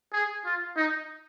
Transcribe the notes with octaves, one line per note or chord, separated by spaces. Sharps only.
G#4
F4
D#4